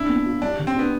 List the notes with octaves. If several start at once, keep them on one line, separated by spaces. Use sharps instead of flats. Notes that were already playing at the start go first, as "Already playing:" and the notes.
Already playing: D4 E4
B3
F4
G3 D4
D3
C4
B3 D4